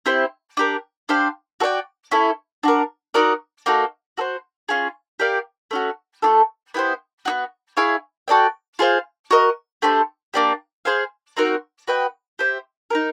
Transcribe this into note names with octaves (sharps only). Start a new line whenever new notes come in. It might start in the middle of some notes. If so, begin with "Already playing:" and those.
C4 E4 G4 C5
D4 G4 A#4
D4 G4 C5 F5
F#4 A4 D5 G5
C#4 E4 A4
D4 F#4 A#4
D#4 F#4 A#4 D5
A#3 D#4 F#4 A4
F#4 A4 C5
C#4 F4 G#4
G4 A#4 D5 F5
A3 C#4 F#4
A3 D4 F4 A4
B3 E4 G4 C5
B3 D#4 F#4
E4 G#4 C#5 F5
F#4 A4 D5 G5
F4 G#4 C5 F5
F#4 A#4 D#5
A3 D4 G4 C5
A#3 D4 G4
G#4 C5 F5 G#5
C4 D#4 F#4 A#4
F#4 B4 D#5 G5
G4 C5 E5
D#4 G4 A#4